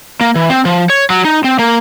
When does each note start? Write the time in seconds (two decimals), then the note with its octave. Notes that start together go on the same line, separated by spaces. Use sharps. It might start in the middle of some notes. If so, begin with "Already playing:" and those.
0.21 A#3
0.36 E3
0.50 C4
0.65 F3
0.90 C#5
1.10 F#3
1.25 D#4
1.44 C4
1.59 A#3